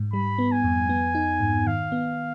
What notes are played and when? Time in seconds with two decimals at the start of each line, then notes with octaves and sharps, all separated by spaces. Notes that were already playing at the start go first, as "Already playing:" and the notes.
Already playing: G#2
0.13 G3 B5
0.38 B3
0.52 G#5
0.64 F2
0.89 B3
1.15 D#4
1.40 G#2
1.67 D#3 F5
1.92 B3